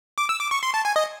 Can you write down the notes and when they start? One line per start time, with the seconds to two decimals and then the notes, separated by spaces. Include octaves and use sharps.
0.18 D6
0.29 E6
0.40 D6
0.51 C#6
0.63 C6
0.74 A5
0.85 G#5
0.96 D#5